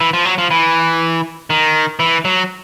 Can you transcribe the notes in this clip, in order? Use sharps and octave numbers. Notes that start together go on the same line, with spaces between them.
E3
F3
F#3
F3
E3
D#3
E3
F#3